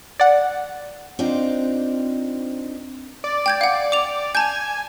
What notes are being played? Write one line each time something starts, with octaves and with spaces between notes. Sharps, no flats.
D5 F#5
C4 D4 D#4 F4 C5
D5
G5 G6 G#6
F5 F#5
D6 F7
G#5 A5 G6